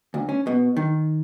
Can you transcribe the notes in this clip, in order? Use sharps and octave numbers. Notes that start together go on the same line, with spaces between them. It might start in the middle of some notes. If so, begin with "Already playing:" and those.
D2
C#4
B2
D#3